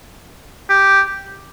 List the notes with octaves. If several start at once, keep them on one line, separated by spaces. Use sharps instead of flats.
G4